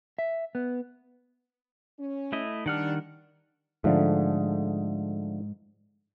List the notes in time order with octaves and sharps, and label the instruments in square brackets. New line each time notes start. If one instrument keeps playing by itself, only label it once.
[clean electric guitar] E5
B3
[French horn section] C#4
[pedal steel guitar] A3 E4 D#5
[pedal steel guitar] D#3 F#5 F6 [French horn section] G3 D4
[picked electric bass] G#2 [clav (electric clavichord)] D3 F3 A3